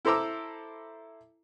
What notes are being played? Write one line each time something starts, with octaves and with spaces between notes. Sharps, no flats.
E4 A4 C5 A#5 D6 E6